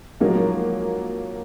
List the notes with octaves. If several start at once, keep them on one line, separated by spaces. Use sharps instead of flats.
F3 F#3 G#3 A#3 D#4